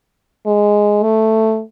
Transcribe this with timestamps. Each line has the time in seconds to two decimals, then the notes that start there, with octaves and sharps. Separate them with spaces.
0.46 G#3
1.03 A3